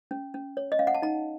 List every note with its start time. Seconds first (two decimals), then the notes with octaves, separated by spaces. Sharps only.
0.11 C#4
0.34 C#4
0.57 C#5
0.72 D#5
0.79 C#4 F5
0.87 F#5
0.94 A5
1.02 D#4 A#5